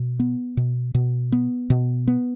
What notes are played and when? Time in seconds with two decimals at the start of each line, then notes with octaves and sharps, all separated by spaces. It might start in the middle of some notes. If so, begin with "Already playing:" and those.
Already playing: B2
0.19 B3
0.57 B2
0.95 B2
1.32 B3
1.70 B2
2.08 B3